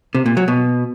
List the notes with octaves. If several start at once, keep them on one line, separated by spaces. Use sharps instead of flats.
C3
A#2
F#3
B2